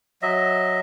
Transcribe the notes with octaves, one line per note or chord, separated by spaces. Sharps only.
F#3 D#5 E5